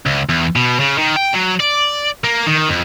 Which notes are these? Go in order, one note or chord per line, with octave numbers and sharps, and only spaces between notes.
C#2
E2
B2
C#3
D#3
G5
F#3
D5
A#3
D#3
F2